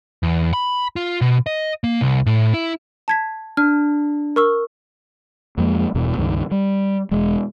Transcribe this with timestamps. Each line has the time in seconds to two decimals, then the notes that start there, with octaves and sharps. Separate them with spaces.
0.23 E2
0.53 B5
0.96 F4
1.21 B2
1.46 D#5
1.84 A#3
2.01 C2
2.26 A2
2.54 E4
3.08 A5 G#6 B6
3.57 D4 F6
4.36 A#4 C#6 E6
5.57 F2 F3 G#3 A#3
5.94 E1 E2 G2 B2
6.17 C#2 G2 D#3
6.51 G3
7.11 E1 G#3